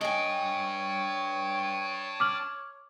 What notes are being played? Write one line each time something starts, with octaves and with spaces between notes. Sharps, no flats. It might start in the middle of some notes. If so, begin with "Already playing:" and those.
D4 C#5 D#5 G5 G#5
D6 F6 F#7